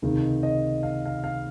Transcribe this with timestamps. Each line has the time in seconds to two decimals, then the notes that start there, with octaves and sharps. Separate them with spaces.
0.02 C#2 C3 D#3
0.43 D#5
0.83 F5
1.05 F5
1.24 F5